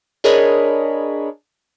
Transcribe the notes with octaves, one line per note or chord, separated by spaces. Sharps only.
D4 G#4 A#4 C#5 D#5 B5